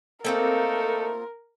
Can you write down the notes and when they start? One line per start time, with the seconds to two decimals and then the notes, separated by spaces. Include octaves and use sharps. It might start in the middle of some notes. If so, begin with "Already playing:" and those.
0.25 A3 A#3 C4 D#4 F4 A4 A#4